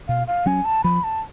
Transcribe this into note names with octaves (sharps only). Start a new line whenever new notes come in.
B2 F5
F5
F#3 C#4 G#5
A5
F3 B5
A5